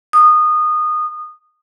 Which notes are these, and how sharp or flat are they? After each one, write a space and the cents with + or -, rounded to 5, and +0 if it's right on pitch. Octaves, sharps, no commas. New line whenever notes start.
D#6 -20